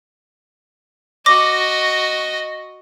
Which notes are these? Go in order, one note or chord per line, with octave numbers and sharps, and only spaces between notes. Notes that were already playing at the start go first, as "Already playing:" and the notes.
F#4 D#5 D6 A#6